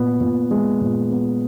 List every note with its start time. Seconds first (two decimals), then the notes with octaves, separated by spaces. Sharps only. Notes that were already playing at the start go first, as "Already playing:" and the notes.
Already playing: A#2 B3
0.21 A#2
0.51 G#3
0.81 A#2
1.11 B3